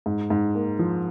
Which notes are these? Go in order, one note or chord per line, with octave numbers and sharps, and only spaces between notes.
G#2
G#2
A#3
F3